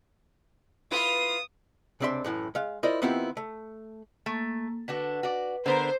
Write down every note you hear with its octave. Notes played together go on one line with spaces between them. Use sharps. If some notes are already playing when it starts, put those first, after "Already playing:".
E4 F4 B4 D#6
C#2 C3 C4 D4 E5 C6
F#2 A2 E3
G#3 F5
E4 F4 A#4 C5 D5 D#5
D#3 B3 C4 E4 F4 G4
A3
A3 A#3
D3 D4 F#4 B4
F#4 D5
D3 B3 A#4 C5